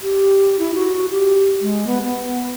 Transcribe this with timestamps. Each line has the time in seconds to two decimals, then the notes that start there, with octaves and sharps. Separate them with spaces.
0.01 G4
0.59 E4
0.75 F#4
1.11 G4
1.61 G#3
1.87 B3
2.03 B3